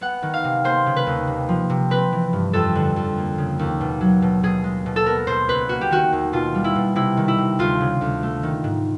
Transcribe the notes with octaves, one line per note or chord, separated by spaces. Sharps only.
B3 F#5
D#3
F5
C3
A#3 C5
C#3
B4
D#2
C3
F3
C3
C4 B4
E3
G2
F2 A4
D3
F2
A#3
C#3
D#2
B2
F#3
B2
B2 G#4
G#3
B2
A4
B3 A#4
B2 C5
C#2 B4
A#3 F#4
G4
D#3 F#4
D#2
B2 F4
G3
E4
B2
C3 E4
D#3
E4
C3
D2 F4
C#3
D2
A3
D#3
G#2